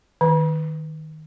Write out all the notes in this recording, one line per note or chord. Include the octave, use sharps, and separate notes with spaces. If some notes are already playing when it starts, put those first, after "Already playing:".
D#3